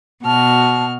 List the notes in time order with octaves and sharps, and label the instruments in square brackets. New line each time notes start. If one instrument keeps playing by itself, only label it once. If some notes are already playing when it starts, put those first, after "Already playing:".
[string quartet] B2 F#4 F6 [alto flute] A5